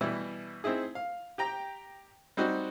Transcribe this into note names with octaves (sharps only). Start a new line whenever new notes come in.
B2 E3 G3 E4
C4 D#4 E4 G#4
F5
G4 G5 A#5
G3 C4 D#4 F#4